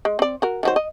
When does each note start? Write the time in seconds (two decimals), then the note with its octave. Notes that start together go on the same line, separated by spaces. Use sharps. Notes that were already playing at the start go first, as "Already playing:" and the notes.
0.05 G#3
0.19 C4 D5
0.42 F#4 A#4
0.63 D#3 F#3 C5
0.76 D#5